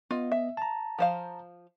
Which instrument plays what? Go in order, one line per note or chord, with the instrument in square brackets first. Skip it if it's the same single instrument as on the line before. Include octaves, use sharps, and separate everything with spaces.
[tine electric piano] B3 D#5 [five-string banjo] F4
[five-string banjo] E5
[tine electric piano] A5 A#5
[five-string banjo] F3 C5 F5